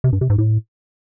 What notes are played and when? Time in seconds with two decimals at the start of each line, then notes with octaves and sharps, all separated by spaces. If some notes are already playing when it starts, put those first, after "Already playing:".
0.04 C3
0.13 G2
0.21 C3
0.30 G#2
0.38 A2